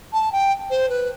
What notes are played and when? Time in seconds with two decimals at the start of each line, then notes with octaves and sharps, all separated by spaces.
0.12 A5
0.32 G5
0.69 C5
0.89 B4